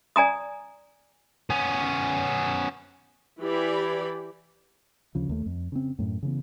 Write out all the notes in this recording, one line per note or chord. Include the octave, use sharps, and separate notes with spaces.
D5 G#5 A#5 D#6
B3 C#4
E3 G4 D5 B5
D2 C#3 F3
D#2 A3
F2
C#3 C4
F#2 A2
C#3 E3 B3